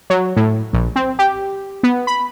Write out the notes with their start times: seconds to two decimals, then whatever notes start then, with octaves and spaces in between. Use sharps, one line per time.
0.10 F#3
0.36 A2
0.73 A#1
0.96 C4
1.19 G4
1.83 B3
2.07 B5